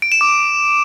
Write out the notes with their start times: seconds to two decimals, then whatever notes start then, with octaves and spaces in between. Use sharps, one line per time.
0.02 D7
0.12 E7
0.21 D6